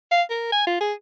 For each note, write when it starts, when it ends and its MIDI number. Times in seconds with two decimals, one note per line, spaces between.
0.11 0.23 77
0.30 0.48 70
0.52 0.64 80
0.67 0.78 65
0.81 0.93 68